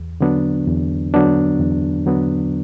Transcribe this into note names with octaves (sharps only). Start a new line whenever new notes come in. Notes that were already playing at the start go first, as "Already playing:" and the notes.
Already playing: E2
D3 F#3 B3 D4
E2
D3 F#3 B3 D4
E2
D3 F#3 B3 D4